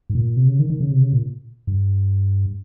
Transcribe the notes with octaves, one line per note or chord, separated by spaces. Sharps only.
G#2
A#2
C3
C#3
D#3
D#3
C#3
C3
C#3
A#2
G2